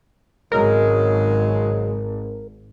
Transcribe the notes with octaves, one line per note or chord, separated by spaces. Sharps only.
G#1 C#3 F#3 G#3 A#4